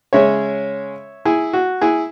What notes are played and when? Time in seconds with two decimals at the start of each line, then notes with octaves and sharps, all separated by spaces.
0.13 C#3 G#3 C#4 C#5 E5
1.25 E4 G#4
1.53 F#4
1.81 E4 G#4